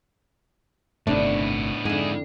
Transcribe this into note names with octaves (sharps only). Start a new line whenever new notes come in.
G1 A2 C3 D#3 A3 B3 D4
F2 G#2 D3 E4 G#4